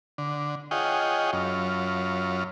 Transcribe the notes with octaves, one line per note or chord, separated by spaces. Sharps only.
D3
F4 G#4 C#5 D#5 F#5 G5
F#2 C#4 F4